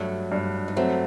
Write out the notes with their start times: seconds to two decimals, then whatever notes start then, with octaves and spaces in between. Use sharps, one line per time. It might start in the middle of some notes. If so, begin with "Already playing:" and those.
Already playing: G2 F#3 A3
0.32 G2
0.68 D#4
0.76 F#3 A3 C4